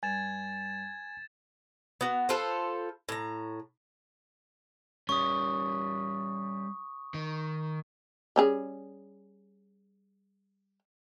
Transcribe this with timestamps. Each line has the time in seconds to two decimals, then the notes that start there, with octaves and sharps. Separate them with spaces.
0.03 G2 G#5 G#6 A6 E7
2.01 B3 F#4
2.29 F4 A4 B4 C5
3.09 A2 A#5
5.09 G3 C#4 C#6 D#6
7.14 D#3
8.36 G3 C#4 G#4